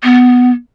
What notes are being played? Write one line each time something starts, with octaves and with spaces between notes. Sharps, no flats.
B3